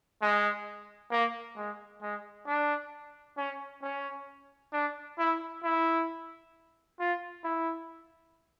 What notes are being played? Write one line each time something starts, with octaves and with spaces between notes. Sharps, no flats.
G#3
A#3
G#3
G#3
D4
C#4
C#4
D4
E4
E4
F4
E4